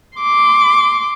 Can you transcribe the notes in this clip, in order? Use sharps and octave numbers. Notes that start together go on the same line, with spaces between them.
C6 D6